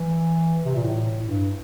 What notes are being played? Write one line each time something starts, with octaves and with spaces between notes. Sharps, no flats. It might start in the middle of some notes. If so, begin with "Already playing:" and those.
Already playing: E3
C3
A#2
A2
G2